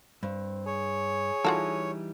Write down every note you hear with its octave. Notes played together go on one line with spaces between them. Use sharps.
G2 C4
G#4 C#5
E3 G3 D#4 F4 F#4 A4